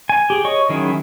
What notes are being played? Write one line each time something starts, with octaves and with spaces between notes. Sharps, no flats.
G#5
G4 G#4
C#5 D#5 C#6
D#3 F#3 C#4 E4 G#4